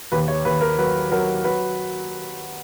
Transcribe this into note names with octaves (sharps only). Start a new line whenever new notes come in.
D#2 B4
C#5
D#2 B4
A#4
F#3 B4
F#3 A#4
F#3 B4